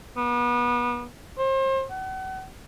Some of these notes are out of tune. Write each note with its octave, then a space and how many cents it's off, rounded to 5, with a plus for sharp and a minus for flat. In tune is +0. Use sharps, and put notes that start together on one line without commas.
B3 -30
C5 +35
F#5 +40